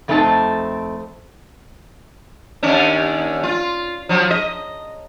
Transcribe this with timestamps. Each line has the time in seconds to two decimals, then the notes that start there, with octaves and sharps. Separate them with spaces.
0.08 F2 A3 C4 D#4 E4 A5
2.63 D#2 C#4 D4
3.43 F4
4.09 F3 F#3
4.31 D#5